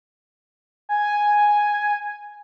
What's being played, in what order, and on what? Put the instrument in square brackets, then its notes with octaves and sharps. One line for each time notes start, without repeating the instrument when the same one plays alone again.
[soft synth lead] G#5